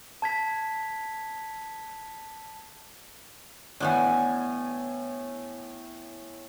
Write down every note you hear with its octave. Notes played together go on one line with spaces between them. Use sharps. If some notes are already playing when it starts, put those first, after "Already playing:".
A5 G#6 B6
A2 E3 B3 D4 G#5